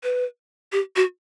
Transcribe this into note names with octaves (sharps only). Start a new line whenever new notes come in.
B4
G4
F#4